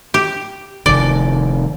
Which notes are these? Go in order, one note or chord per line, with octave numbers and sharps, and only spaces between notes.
G4
F1 D#3 D5